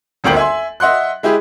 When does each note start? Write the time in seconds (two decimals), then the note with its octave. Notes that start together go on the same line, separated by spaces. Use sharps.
0.24 D#1 G#1 D2 A#3 G5 F#7
0.36 E5 G#5 C6
0.80 D#5 E5 F#5 C6 F#6
1.23 G#3 E4 G4 G#4